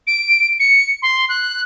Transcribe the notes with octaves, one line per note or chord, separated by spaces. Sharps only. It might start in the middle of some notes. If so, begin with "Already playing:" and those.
D7
C#7
C6
F#6